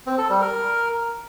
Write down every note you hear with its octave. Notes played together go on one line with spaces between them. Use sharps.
C4
A4
G3
A#4